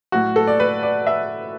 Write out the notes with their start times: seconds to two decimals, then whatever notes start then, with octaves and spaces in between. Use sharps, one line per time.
0.12 A2 F#3 F#4
0.36 A4
0.47 D5
0.60 B4
0.83 D5
1.07 E5